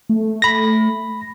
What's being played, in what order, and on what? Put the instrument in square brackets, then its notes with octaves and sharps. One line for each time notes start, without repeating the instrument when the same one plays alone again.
[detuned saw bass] A3
[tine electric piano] B5 A#6